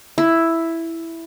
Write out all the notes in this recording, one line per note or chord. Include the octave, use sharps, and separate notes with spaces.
E4